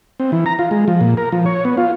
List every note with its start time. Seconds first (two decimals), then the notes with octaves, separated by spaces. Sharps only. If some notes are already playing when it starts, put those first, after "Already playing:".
0.20 C4
0.32 E3
0.46 A#5
0.59 F4
0.71 G#3
0.88 F3
1.01 A#2
1.17 A#4
1.32 F3
1.46 C#5
1.65 B3
1.77 F4